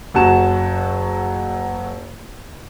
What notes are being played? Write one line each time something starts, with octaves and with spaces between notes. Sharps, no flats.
F#1 F#2 F#4 A5 E7